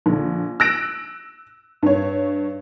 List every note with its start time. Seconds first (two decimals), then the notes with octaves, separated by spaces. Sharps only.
0.06 A#1 D3
0.60 E6 F#6 A#6 D7
1.83 G2 C#5